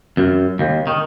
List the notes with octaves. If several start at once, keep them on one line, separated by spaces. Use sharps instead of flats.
F#2
D#2
D#3